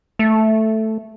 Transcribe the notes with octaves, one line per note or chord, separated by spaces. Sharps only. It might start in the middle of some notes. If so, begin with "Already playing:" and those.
A3